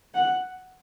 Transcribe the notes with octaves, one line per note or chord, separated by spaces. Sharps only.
F#5